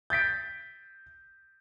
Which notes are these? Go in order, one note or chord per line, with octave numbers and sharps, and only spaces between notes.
G6 A6 B6 D7